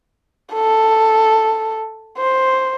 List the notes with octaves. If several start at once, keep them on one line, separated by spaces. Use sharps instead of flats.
A4
C5